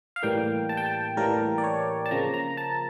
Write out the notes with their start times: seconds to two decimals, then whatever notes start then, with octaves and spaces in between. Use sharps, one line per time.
0.16 F5
0.23 A2 E3 G3 A#3 G5
0.69 A5
0.77 G5
0.86 A5
1.17 A2 E3 G3 A#3 A#4
1.58 D5
1.64 C#5
2.06 A5
2.11 C#3 F3 A#3 A#5
2.34 A#5
2.57 A5